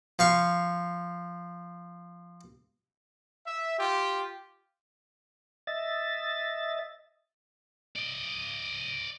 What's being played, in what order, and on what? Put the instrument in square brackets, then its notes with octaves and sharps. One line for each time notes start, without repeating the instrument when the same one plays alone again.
[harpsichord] F3 F5 C#6
[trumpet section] E5
F4 G4
[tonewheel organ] D#5 E5 A6
[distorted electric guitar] D5 D#5